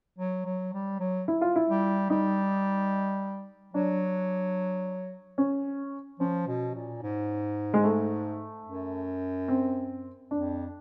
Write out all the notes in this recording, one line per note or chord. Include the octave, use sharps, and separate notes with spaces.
F#3
F#3
G3
F#3
E4
F4
E4
G3
G3 D#4
F#3 D4
C#4
F3 C#4
B2
A#2
G#2
G#3
A3
F#2
C4
F2 D4